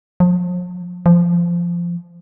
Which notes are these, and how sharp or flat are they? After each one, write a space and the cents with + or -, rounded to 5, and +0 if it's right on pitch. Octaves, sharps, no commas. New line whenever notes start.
F3 +40
F3 -15